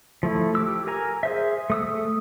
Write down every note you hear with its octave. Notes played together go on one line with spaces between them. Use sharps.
F3 A3 E4
G4 D6 E6
A#4 G#5 A#5
G#4 C5 E5
A3 D#6 E6